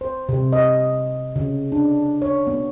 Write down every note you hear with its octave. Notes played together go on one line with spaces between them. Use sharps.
C5
C3
D#5
C#3
D4
C#5
B3